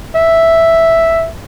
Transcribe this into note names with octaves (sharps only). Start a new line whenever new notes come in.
E5